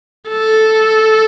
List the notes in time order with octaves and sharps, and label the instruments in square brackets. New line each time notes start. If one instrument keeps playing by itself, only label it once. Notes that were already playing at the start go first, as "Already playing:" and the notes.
[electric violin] A4